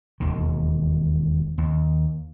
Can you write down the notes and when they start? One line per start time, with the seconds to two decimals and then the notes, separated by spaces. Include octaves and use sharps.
0.20 E1 D#2 D#3
1.58 D#2